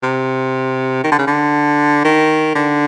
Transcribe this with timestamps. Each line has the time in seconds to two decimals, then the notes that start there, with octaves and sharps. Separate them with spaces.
0.03 C3
1.04 D#3
1.12 D3
1.19 C#3
1.27 D3
2.04 D#3
2.55 D3